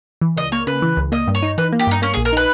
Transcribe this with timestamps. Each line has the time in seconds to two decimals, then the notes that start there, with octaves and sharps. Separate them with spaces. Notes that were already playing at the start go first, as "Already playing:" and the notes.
0.21 E3
0.37 C#2 D#5
0.52 A#3 C#5
0.67 C#3 B4
0.82 E3
0.97 C#2
1.12 A#3 D#5
1.27 G2
1.35 C#5
1.42 D#4
1.58 E3 B4
1.73 A#3
1.79 G4
1.87 G2 D#4
2.02 A#3 C#4
2.14 G#4
2.17 A#1
2.25 A#4
2.32 D#4 B4